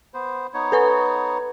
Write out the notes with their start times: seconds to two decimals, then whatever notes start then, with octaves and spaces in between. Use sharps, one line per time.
0.14 B3 C5
0.54 B3 D#4 C#5
0.72 A4 B4 C#6